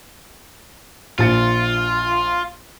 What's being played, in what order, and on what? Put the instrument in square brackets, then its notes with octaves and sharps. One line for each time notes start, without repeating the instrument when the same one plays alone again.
[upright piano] A#1 A6 C#7 [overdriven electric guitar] F4